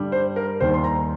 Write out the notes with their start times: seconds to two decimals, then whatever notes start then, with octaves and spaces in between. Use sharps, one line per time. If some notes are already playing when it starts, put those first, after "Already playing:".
Already playing: G2 D3 G3
0.12 C5
0.36 A#4
0.60 D#2 D#3 G3 C5
0.74 C6
0.84 A#5